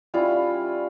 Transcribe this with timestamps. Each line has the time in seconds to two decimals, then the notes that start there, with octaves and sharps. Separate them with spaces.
0.14 G3 C#4 E4 F4